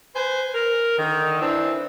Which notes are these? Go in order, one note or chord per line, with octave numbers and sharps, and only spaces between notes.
B4 C5 G#5
A#4
D3 D#3
E3 C4 D4 E4